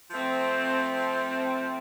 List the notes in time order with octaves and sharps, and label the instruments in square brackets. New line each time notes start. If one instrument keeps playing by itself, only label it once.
[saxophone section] F3 A3 C4